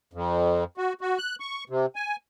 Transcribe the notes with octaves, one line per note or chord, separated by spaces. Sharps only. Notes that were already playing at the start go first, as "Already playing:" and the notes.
F2
F#4
F#4
F#6
C#6
C3
G#5